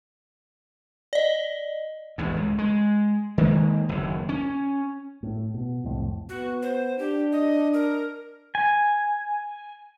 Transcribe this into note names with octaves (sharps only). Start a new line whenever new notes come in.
D5 D#5
A1 E2 G#2
C#2
G#3
D#3 G#3 A#3
F#1 D#2
C#4
A2
B2
C2 F2 A2
B3 F#4
C5
D4 G4
D#5
A#4
G#5